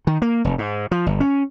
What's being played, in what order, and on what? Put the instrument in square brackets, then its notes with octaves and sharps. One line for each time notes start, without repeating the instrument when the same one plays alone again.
[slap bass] D#3
A#3
F1
G#2
F3
G1
C#4